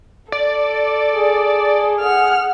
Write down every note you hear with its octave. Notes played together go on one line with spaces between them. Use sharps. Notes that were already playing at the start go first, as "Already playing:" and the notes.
A4 D5
G#4
F#5 F6